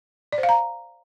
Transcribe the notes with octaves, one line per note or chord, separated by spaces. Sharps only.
D5
C5
F5
A#5